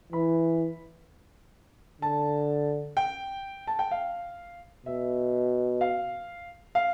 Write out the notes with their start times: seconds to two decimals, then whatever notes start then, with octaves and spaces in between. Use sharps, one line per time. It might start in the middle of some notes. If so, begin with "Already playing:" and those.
0.12 E3 B5
2.02 D3 A5
2.97 G5
3.67 A5
3.79 G5
3.91 F5
4.86 B2 E5
5.81 F5
6.75 F5